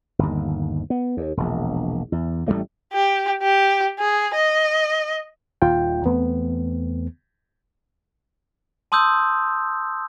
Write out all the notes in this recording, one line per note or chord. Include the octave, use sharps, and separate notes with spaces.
G1 D#2
B3
D#2
E1 A#1
E2
A1 E3 G3 A3
G4
G4
G#4
D#5
D#1 D#2 F4 G5
E2 A3 B3 C4
A5 C6 D#6 E6 G6